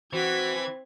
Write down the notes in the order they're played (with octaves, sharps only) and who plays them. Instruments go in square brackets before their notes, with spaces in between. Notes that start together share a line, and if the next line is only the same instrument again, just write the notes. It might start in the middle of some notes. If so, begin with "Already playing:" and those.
[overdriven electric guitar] E3 [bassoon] C4 [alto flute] F#4 [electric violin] G#6 B6